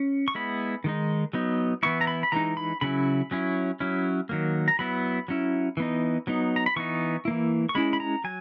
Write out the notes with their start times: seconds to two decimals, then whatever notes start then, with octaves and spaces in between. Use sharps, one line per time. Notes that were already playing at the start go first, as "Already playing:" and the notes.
Already playing: C#4
0.28 C#6
0.35 G#3 B3 E4 B5
0.84 D#3 G#3 D#4
1.33 F#3 B3 D#4
1.83 E3 B3 E4 C#6
2.01 A#5
2.07 B5
2.23 B5
2.32 E3 G#3 D#4 A#5
2.57 B5
2.81 C#3 F#3 C#4 E4 B5
3.31 F#3 C#4 E4
3.80 F#3 C#4 E4
4.29 D#3 F#3 A#3
4.68 A#5
4.79 F#3 B3 E4 B5
5.28 F#3 C#4 E4
5.77 E3 B3 D#4
6.27 F#3 B3 D#4
6.56 A#5
6.66 B5
6.76 E3 B3 D#4 C#6
7.25 E3 A#3 E4
7.69 C#6
7.75 G#3 C#4 E4 B5
7.93 B5
8.00 A#5
8.24 F#3 G#5